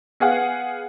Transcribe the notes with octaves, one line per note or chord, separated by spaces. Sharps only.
B3 G#4 F5 F#5